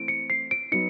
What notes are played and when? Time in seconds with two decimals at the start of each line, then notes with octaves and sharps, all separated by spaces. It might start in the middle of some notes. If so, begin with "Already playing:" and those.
Already playing: E3 A3 C4 E4 D7
0.08 C#7
0.30 C7
0.51 D7
0.72 F#3 B3 D#4 C#7